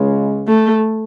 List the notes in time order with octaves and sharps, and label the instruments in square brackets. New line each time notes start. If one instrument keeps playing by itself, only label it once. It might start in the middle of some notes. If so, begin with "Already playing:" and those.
Already playing: [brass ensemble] C#2 C#3 G#3
[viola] A3